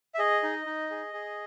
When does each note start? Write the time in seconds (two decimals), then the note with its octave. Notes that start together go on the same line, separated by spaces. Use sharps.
0.15 E5
0.19 G#4 D#5
0.43 D#4
0.66 D#4
0.90 G#4
1.13 G#4